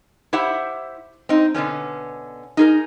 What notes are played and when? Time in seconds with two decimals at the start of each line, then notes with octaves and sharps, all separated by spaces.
0.33 E4 G4 C5 E5 F#5
1.29 C4 D#4
1.54 B2 D3 B3 C#4
2.57 D#4 G#4 A#4